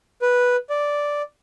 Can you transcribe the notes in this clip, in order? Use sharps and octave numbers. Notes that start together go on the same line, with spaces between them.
B4
D5